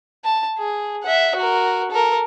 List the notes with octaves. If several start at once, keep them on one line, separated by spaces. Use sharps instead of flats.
A5
G#4
E5 F#5
F#4 A#4
A4 A#4